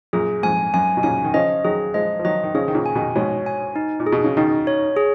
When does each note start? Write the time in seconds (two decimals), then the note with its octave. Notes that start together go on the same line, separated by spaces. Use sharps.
0.13 F#2 A#2 G#4
0.43 F2 G#2 G#5
0.74 F#2 G#5
0.97 B2
1.03 A#2 C#3 G#5
1.24 D#3
1.34 C#3 F3 D#5
1.64 D#3 F#3 G#4
1.94 F3 G#3 D#5
2.19 F3
2.25 D#3 F#3 D#5
2.43 D#3
2.55 C#3 F3 G#4
2.68 D#3
2.75 A#2 C#3
2.86 G#5
2.95 B2 D#3
3.16 G#2 B2 C#5
3.46 G#5
3.76 D#4
4.00 A#2
4.06 G#4
4.12 B2
4.24 C#3
4.37 B2 D#3 D#4
4.67 C#5
4.97 G#4